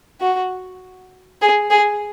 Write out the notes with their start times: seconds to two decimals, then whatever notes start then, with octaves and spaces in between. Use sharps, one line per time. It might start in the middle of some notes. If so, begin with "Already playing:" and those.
0.21 F#4
1.42 G#4
1.71 G#4